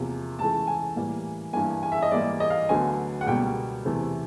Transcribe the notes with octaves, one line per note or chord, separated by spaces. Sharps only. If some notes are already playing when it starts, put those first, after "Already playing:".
Already playing: E2 C3 F3 A#3
C#2 C#3 E3 A3 A5
G#5
A2 E3 G3 A#3
G2 E3 G3 A#3 G#5
G#5
E5
D#5
G#2 E3 G3 A#3 D5
D#5
F5
D2 D3 F#3 B3 G#5
F#5
C#2 B2 G3 A#3 G5
E2 C3 E3 A3